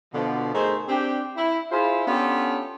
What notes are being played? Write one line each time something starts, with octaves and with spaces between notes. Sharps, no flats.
B2 D3 F3
A3 D#4 G#4 A#4 C5
C4 D4 G4
E4
E4 F4 G#4 C5 F5 B5
B3 C#4 D4 F4 G4 A4